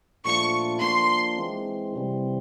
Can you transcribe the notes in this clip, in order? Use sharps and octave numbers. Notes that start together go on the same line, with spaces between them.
A#2 F3 A3 D4 F4 C#6
F3 A#3 D4 C6
E3 G#3 C4
C3 E3 G3 C4